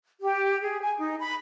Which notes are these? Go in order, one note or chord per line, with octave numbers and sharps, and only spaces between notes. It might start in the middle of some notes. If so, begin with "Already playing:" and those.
G4
G#4
G#5
D#4
B5